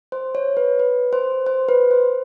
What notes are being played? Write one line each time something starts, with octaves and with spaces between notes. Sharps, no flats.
C5
C#5
B4
B4
C5
C5
B4
C5